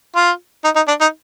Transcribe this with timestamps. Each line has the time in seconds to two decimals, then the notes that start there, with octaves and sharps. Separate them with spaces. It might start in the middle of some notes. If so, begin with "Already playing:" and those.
0.16 F4
0.64 D#4
0.76 D#4
0.88 D4
1.01 D#4